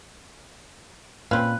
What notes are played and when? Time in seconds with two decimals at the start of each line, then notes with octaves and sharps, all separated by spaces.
1.31 A#2 C4 C#4 B4 F5 F#6